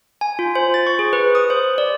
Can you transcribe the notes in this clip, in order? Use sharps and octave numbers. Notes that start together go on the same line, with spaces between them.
G#5
F4
C5
A6
C#6
G#4
B4
D#6
C5
D5